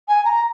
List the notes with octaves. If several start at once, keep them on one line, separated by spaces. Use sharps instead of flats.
G#5
A#5